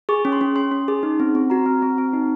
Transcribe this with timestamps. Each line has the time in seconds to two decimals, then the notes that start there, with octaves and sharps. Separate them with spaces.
0.09 G#4 C#6
0.25 C#4
0.33 C6
0.41 C#4
0.56 C#4 C6
0.71 C#4
0.88 G#4
1.03 D#4
1.20 C4
1.35 C4
1.50 F#4 A#5
1.66 C4
1.82 C4
1.98 C4
2.13 D#4